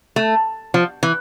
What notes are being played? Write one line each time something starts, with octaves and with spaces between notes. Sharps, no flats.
A3
F3
E3